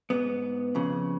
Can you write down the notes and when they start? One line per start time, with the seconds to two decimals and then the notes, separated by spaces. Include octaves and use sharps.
0.10 G#2 B3
0.75 F2 C#3